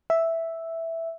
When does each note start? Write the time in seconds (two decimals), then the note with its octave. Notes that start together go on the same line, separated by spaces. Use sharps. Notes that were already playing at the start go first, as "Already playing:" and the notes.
0.10 E5